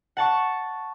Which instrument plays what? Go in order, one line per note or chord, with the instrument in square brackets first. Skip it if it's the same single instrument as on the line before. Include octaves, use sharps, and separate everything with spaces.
[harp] F#5 A5 C#6